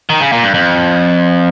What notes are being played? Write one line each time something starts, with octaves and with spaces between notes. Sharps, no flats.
D#3
C#3
A#2
G2
F2